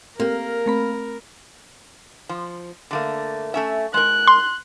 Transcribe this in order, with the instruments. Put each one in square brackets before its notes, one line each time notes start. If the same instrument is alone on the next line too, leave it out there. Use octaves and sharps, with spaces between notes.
[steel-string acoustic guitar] A#3 [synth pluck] C4 G4 [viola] A#4
[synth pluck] A3 C4 B5
[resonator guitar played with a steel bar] F3
D3 A3 A#3
A3 C#4 E5
[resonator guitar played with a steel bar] G#3 A#4 [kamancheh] F#6
[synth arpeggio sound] C6